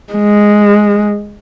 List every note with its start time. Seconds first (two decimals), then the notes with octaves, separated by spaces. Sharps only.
0.13 G#3